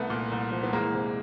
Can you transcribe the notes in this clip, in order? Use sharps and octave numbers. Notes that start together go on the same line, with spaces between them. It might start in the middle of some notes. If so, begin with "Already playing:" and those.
Already playing: C2 A3 B3
A#2
C2
F3
B3
E2 G#3 A#3
C3